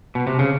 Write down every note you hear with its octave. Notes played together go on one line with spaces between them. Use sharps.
B2
C3
C#3